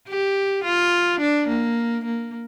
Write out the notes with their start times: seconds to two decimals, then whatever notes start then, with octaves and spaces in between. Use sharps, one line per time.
0.08 G4
0.64 F4
1.21 D4
1.49 A#3
2.05 A#3